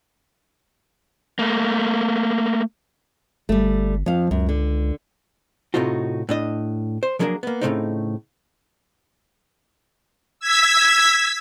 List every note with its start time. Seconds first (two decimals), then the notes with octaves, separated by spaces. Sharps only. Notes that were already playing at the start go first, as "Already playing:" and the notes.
1.39 A3 A#3
3.49 G1 G3 A3
4.06 F2 F3 F5
4.31 C#2 F#2
4.49 D3
5.74 A2 C3 A3 D#4 F4 F#4
6.29 A2 D4 D#5
7.03 C5
7.19 F3 F#3 A#3 D4 G#4 A#4
7.43 A#3 B3
7.61 A2 C#3 F#3 A3 C4 D#4
10.40 E6 G#6 B6